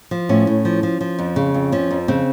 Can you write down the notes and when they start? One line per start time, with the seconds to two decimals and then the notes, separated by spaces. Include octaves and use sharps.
0.11 F3
0.29 A2 C#4
0.47 A2
0.65 F3
0.83 F3
1.01 F3
1.19 F2
1.36 C#3
1.54 F2
1.72 F3 C#4
1.91 F2
2.08 C#3 C4